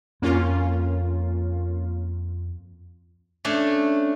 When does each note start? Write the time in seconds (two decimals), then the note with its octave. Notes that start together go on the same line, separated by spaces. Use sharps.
0.22 F2 A#3 C#4 F4
3.45 A3 C#4 D4